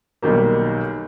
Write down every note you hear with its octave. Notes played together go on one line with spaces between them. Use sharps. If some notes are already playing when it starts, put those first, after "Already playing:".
B1 D#3 G3 A#3